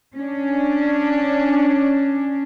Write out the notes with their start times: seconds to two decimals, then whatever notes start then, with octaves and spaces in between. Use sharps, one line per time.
0.17 C#4 D4